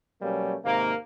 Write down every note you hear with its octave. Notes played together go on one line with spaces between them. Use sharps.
B2 F#3 G3 A3 A#3 C#4
G#2 C3 D#3 A#3